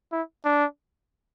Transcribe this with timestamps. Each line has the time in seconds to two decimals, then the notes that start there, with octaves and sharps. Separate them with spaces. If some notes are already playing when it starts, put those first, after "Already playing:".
0.12 E4
0.45 D4